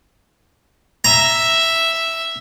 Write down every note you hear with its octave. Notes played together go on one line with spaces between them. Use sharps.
E5 A#5